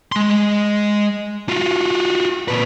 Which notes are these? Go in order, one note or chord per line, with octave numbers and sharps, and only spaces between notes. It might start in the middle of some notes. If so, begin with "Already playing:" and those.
G#3 C6
F4 F#4
A#2 B4